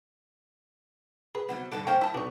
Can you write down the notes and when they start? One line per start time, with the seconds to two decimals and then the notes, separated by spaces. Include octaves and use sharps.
1.35 G#4 B4
1.49 C3 F#3 G3 B3
1.72 G2 B2 D3 A4 F#5 D6
1.87 A#3 C#4 D#4 A#4 C5 C#5 G5
2.01 G2 G3 E4 A5
2.14 B1 B3 D4 D#4 C#5